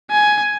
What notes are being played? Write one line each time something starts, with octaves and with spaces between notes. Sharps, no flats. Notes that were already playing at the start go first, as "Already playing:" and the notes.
G#5